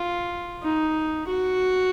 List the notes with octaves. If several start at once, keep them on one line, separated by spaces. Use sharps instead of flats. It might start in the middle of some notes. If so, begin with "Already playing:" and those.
Already playing: F4
D#4
F#4